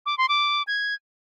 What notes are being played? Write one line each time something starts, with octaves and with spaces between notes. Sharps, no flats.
D6
C6
D6
G#6